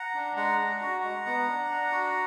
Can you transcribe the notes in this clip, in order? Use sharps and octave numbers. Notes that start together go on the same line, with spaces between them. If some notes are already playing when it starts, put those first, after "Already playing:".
Already playing: F#5 A#5
D4
G#3 F#5 A#5
D4
F#4
G#3
B3
D4
D4
F#4